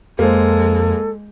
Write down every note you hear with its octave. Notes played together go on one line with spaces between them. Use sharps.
F2 G#3 A#3 A4 C5